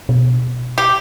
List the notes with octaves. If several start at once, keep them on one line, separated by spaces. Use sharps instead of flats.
B2
G4